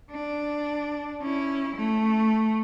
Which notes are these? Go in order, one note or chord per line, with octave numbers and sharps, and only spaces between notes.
D4
C#4 E4
A3